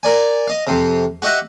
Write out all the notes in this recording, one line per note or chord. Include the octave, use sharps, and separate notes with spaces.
A#4 D5 G#5
D#5 F5
F2 C3
F#4 G4 D#5 E5 F#5